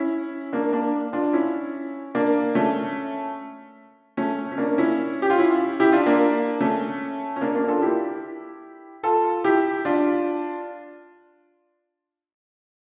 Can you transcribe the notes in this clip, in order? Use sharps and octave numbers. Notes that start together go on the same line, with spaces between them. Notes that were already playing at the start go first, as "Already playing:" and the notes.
Already playing: C#4 E4
A#3 D4
A#3 D4
D4 F4
C#4 E4
A#3 D4
A3 C#4
A3 C#4
C#4
A#3 D4
C#4 E4
G4
F4
C#4 E4
E4 G4
D4 F4
A#3 D4
A3 C#4
C#4
A#3 D4
A#3 D4
A#4
F4 A4
E4 G4
F4 A4
E4 G4
D4 F4